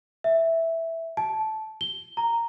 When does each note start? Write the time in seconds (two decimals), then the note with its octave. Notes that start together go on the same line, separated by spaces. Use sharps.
0.24 E5
1.17 A5
1.81 G7
2.17 A#5